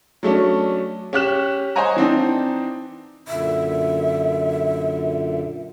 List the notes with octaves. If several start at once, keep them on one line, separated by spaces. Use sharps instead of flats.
F#3 A3 C#4 D4
C#4 G4 F#6 E7
C5 C#5 D#5 F#5 G#5 A#5
E3 C4 D4 D#4
F#2 A#2 D3 E5